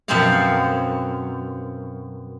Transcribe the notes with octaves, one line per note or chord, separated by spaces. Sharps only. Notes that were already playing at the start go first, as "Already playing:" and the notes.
F#2 B2 F3 C4 C5 F5